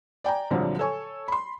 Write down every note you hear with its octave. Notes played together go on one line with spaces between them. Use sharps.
D5 G5 G#5 A#5
C2 A#2 D3 F3 F#3
A4 C#5 G#5 C#6
B5 C6